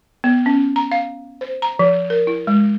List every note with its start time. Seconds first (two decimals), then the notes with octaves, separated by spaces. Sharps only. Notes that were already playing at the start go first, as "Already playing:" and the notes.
0.24 B3
0.46 C#4
0.76 A#5
0.92 F5
1.41 C5
1.62 A#5
1.79 F3
2.10 A#4
2.27 E4
2.47 G#3